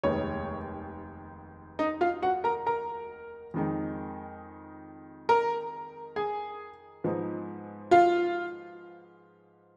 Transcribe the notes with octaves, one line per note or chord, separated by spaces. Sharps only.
F1 D#2 D#3 G#3 B3 C#5
D#4 D#5
F4 F5
F#4 F#5
A#4 A#5
A#4 A#5
F2 D#3 G#3 D#4
A#4 A#5
G#4 G#5
G#2 F3 G#3 B3 D#4
F4 F5